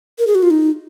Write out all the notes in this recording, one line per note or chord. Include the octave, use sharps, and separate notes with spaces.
A#4
G#4
F#4
F4
D#4